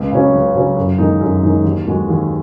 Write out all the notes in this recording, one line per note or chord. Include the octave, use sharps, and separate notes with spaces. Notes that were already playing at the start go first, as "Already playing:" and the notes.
Already playing: C#2
C#3 F#3 C#4
C#2
C#3 F#3 C#4
F#2
D#3 G#3 D#4
F#2
D#3 G#3 D#4
D#2
D#3 G#3 F#4
D#2